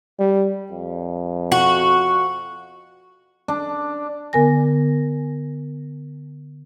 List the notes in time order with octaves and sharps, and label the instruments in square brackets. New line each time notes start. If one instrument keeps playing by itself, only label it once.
[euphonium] G3
F2
[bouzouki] F#4
[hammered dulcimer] D4
[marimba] D3 B3 A#4 G#5 A#6